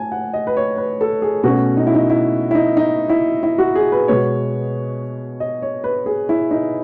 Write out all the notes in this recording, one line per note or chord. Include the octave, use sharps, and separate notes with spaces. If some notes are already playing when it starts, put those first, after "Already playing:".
Already playing: A2 G#5 A5
F#5
D#5
B4
C#5
B4
A4
G#4
B2 A3 C#4 F#4
D#4
E4
D#4
E4
E4
D#4
D#4
E4
E4
F#4
G#4
B4
B2 G#3 B3 C#5
D#5
C#5
B4
G#4
E4
D#4